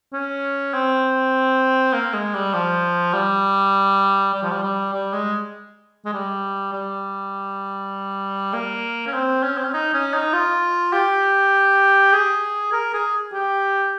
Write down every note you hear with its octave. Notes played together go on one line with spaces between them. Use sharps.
C#4
C4
A#3
G#3
G3
F3
G3
G3
F3
G3
G3
G3
G#3
G#3
G3
G3
A#3
C#4
C4
C#4
C4
C#4
D#4
C#4
D#4
F4
G4
G#4
A#4
G#4
G4